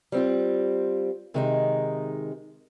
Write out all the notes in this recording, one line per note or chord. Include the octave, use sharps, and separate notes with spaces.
G3 C4 F4
C3 D#3 G#3 D#4